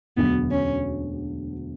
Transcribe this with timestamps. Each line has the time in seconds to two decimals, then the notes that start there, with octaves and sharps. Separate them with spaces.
0.16 E1 D2 D3 F#3 B3
0.51 C#4